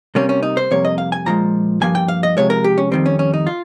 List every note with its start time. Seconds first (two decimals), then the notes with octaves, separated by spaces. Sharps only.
0.15 C3 G3 A#3 C#4
0.29 C#4
0.43 D#4
0.57 C5
0.71 F2 C3 G3 A#3 C#5
0.85 D#5
0.98 F5
1.12 G#5
1.26 A#2 F3 G#3 A#5
1.81 G2 F3 A#3 G#5
1.95 G5
2.08 F5
2.23 D#5
2.37 C3 F3 G#3 C#5
2.50 A#4
2.64 G4
2.78 C#4
2.91 F2 D#3 G3 C4
3.06 C#4
3.19 C#4
3.34 D#4
3.47 F4